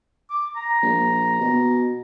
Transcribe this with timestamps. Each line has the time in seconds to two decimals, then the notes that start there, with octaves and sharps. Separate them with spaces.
0.30 D6
0.56 A#5
0.82 A#1
1.41 B2